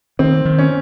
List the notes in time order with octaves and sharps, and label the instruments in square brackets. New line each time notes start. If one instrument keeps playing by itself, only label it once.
[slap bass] D#3 [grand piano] C4
[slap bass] D#3
[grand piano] C#4